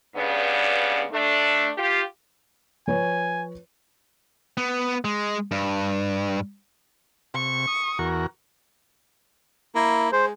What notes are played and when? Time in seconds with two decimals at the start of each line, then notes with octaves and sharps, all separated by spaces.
0.16 G2 C#3 B3 D5
1.12 A3 D4
1.77 F4 G4
2.87 F3 B4 C#5 G#5
4.57 B3
5.05 G#3
5.51 G2
7.34 C3 C#6
7.67 D#6
7.99 E2 F#4 A#4
9.75 A#3 E4
10.12 G#3 C5